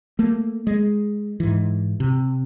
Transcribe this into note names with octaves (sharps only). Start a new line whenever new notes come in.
A3 A#3
G#3
G#2 E3
C3